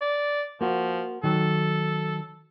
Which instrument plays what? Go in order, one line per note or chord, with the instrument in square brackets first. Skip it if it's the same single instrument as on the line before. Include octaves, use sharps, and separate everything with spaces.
[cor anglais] D5
[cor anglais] F3 [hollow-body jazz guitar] A#3 F#4
[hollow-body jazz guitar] D#3 F#3 [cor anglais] A4